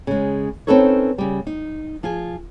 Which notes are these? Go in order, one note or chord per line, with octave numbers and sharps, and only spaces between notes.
C#3 G#3
C4 C#4 D#4 A4 B4 C#5
C#3 G3
D#4
F3 F4 G#4 G#5